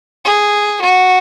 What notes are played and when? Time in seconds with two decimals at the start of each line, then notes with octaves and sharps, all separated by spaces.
0.25 G#4
0.81 F#4